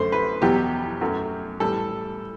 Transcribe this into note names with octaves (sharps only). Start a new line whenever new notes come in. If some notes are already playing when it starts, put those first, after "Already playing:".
Already playing: F#2 D3 A3 C5
B4
E2 B2 F#3 G4
F#2 F#3 A3
A2 E3 G3 A4